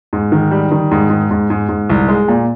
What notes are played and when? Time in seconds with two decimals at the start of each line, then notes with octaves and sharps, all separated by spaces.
0.13 G#2
0.32 D#3
0.51 G3
0.71 D#3
0.91 G#2
1.10 G#2
1.31 G#2
1.50 G#2
1.69 G#2
1.89 C2
2.08 G#3
2.28 A#2